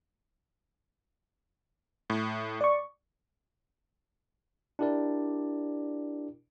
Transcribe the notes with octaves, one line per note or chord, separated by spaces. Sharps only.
A2
D5 C#6
D4 E4 G4 A#4 D5